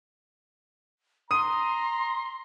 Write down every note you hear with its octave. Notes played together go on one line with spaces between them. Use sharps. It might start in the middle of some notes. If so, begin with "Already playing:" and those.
A#5 C6 D#6 D#7